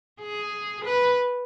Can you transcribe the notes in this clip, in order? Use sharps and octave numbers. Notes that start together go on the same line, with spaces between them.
G#4
B4